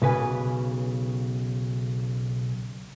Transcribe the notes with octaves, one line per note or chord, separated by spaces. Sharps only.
B1 C#3 B4 G#5